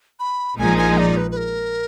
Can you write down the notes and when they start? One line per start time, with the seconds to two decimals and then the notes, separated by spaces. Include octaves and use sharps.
0.20 B5
0.59 A#1 A#2 F3 G#3 D#4 G#5
0.78 G#5
0.98 D5
1.17 B4
1.31 B4
1.37 A#4